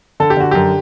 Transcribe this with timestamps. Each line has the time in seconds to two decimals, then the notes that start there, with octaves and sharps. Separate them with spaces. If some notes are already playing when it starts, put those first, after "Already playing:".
0.20 D3 A4
0.30 G4
0.37 D3 F#4
0.51 F#2 G4